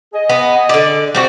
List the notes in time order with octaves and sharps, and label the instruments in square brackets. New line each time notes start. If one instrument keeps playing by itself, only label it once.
[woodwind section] G#4 D#5
[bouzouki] B3
D3 D5
G3 C4 F#4